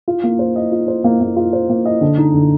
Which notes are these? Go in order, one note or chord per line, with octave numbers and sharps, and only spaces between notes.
F4
A#3
C5
D#5
F4
C5
A#3
A#3
F4
C5
A#3
D#5
D3
D#4
D3